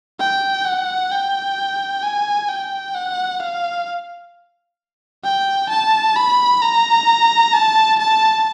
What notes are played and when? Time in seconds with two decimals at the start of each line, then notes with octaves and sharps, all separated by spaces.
0.20 G5
0.65 F#5
1.11 G5
2.03 G#5
2.48 G5
2.94 F#5
3.40 F5
5.24 G5
5.69 A5
6.16 B5
6.62 A#5
7.53 A5
7.99 A5